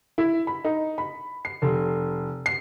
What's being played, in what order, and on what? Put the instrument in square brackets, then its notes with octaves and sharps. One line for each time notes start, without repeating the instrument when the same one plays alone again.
[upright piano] E4
B5
D#4
B5
C7
F1
C7